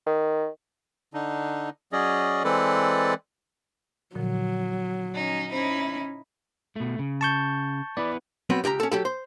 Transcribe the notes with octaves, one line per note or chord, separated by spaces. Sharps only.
D#3
D3 D4 D#4
F#3 C#4 G#4 D5 D#5
E3 G#3 C4 A4 B4 D5
A#2 D3 F3 F#3
C#4 D#4
C#4 D#4 E4 C5
B2 A3
C#3
A5 C#6 G6
B3 E4 B4 D5
F#3 B3 C4
C#2 G4 A5 A#5
C#4 A4
F#3 G4 A4
C5